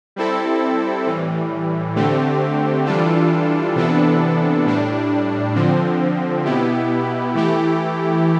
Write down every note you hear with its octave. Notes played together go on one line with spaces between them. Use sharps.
G3 C4 E4 A4
A2 E3 G3
D3 A3 C4 G4
E3 G3 D4 F4 A4
C3 E3 B3 D4 A4
A2 G3 D4
D3 F3 C4
B2 B3 E4 G4
E3 A3 E4 G4